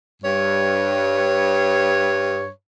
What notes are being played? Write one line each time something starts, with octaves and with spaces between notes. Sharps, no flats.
G2 C#5